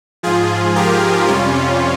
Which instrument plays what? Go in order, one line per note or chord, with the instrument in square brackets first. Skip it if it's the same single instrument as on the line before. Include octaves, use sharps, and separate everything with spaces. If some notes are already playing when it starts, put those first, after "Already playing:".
[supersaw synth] G#2 F3 F4 G#4
G4 A#4
F2 C3 G3 C#4 F4